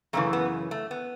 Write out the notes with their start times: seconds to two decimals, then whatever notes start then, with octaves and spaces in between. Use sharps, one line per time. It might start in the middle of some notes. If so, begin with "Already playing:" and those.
0.13 F#2 C#3 E3 A3
0.33 B3
0.71 A3
0.91 B3